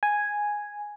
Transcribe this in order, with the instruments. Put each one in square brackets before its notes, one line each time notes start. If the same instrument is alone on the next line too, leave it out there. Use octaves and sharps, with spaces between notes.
[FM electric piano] G#5